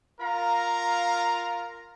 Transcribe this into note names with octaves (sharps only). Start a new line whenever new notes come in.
F4 A#4 F5 A#5